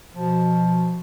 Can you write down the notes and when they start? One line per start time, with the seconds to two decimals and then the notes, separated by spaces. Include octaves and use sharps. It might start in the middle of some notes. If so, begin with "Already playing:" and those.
0.15 B2 F3